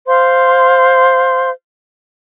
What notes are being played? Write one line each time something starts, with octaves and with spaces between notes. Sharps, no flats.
C5 F5 C6